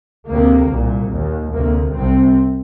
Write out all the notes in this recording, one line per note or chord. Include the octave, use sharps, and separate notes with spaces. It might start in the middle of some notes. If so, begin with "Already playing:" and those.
D2 C3 A#3
C2 A#2
D#2
D2 C3 A#3
C2 C3 C4